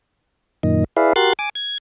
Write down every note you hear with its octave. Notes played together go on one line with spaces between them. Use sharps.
F#2 A#2 D#3 D#5
E4 G#4 B4 D5 E5 F5
F#4 G4 A#4 C6 F#6 A6
G#5 D6
G#6